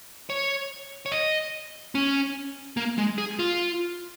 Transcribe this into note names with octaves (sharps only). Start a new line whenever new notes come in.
C#5
C#5
D#5
C#4
A#3
G#3
G#4
F4